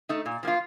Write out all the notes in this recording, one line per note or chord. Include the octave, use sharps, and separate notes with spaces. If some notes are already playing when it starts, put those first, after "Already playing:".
A3 D#4
A#2
F3 A#3 F4